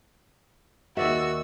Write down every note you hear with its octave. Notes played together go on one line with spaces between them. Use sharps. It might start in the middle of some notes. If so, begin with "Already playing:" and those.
D#2 F#4 D5 E5 E6